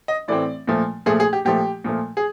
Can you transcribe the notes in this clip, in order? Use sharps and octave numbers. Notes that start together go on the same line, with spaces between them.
D#5
A2 E3 A3 C4 D5
A#2 F3 A3
A#2 F3 A3 G#4
G#4
G4
A#2 F3 A3 G4
A#2 F3 A3
G#4